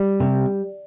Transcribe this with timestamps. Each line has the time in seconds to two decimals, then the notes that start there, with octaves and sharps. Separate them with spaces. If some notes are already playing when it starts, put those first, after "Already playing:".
Already playing: G3
0.20 C3